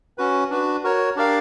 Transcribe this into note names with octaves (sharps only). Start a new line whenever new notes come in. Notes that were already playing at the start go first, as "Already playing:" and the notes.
C#4 F#4 B4
D4 F#4 B4
F#4 A#4 C#5
D4 G4 A#4 D5 F5